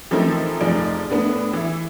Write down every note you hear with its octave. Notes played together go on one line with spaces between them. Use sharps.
E3 F3 A3 C4 D#4 A#4
F1 F3 D#4 G#4 D5 D7
A2 B3 D4
E3 E4